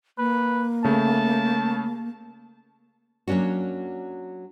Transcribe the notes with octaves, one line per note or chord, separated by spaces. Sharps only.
A#3 B4
C#3 A3 A5
F#3 A#3 C#4 D4 F#4